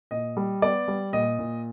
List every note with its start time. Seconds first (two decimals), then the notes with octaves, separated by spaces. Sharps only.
0.11 A#2 D#5
0.37 G3
0.62 B3 D5
0.88 G3
1.13 A#2 D#5
1.39 A#2